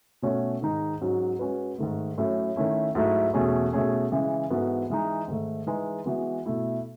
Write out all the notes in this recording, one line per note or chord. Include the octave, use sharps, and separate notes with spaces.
B2 A3 C#4 F#4 C#5
G#2 D#3 G#3 D#4
G#2 F#3 C#4 F#4
G#3 C#4 F#4 B4
G#2 D#3 A3
A2 F#3 C#4
D#3 A3 C#4 E4
G#2 F#3 A3 E4
E2 B2 A3 C#4 G#4
B2 A3 C#4 G#4
C#3 E3 G#3
G#2 E3 B3 F#4 A4
E3 G#3 D#4
G#2 D#3 A3
E3 G#3 D#4 G#4 B4
E3 G#3 B3 F#4
B2 A3 E4